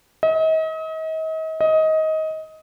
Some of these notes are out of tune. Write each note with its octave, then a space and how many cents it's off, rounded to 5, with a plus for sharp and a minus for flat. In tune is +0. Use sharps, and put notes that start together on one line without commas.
D#5 +40
D#5 +20